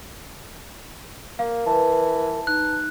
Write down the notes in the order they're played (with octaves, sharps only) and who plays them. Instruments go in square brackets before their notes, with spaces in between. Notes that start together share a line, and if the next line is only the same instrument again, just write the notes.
[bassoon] A#3 [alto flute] A#4 [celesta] F5
[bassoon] E3 [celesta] B4 A5
[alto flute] D#4 [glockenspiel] F#6